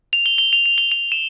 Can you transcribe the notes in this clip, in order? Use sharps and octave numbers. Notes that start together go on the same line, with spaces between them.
F7
G7
G7
F7
F7
G7
F7
E7